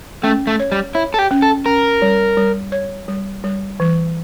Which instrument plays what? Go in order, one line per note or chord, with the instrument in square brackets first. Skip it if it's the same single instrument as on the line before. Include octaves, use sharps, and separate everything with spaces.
[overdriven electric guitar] A3 [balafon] C#4
[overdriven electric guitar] A3
[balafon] C#5
[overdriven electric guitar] G3
[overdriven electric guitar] E4 [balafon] C#5
[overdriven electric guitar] A4
G4
[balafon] C#4
[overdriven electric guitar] A4
[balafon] C#4 [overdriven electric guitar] A#4
[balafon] G3
G3
C#5
G3
G3
E3